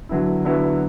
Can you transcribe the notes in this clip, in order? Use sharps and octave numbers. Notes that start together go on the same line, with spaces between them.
D3 F#3 B3 E4
D3 F#3 B3 E4